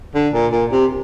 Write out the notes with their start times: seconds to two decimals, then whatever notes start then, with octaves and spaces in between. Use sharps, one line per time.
0.15 D3
0.34 A#2
0.52 A#2
0.72 C3